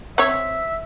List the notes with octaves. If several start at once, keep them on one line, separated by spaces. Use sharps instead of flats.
C4 C#5 E5